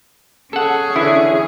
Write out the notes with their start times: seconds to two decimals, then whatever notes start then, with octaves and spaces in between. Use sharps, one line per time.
0.53 C#4 G#4 A4 F#5
0.96 D3 E3 E4